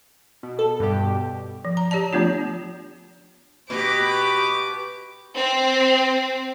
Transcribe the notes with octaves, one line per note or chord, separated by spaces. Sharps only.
B2
A4
G2 B2 G4
F3
A#5
G4 C#5 D5 A5
F3 A3 B3 D4 F4
B2 G4 B4 D6
C4